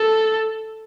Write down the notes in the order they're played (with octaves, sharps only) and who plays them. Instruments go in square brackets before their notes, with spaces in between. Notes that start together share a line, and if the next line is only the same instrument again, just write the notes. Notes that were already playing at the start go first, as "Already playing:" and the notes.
Already playing: [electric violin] A4